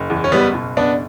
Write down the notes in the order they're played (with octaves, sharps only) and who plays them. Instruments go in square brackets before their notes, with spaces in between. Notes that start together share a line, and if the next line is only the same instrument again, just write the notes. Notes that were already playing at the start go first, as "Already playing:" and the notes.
Already playing: [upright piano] F#1
E2
[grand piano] C#4
[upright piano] F#1 [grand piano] G3 B3
[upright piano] B2
[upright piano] F#1 [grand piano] B3 D4